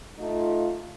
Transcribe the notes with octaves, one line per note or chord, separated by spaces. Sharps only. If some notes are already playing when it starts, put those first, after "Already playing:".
A3 D#4 F4